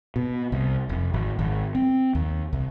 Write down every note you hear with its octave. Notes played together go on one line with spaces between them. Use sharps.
B2
C2
F1
G#1
G#1
C4
D#2
C2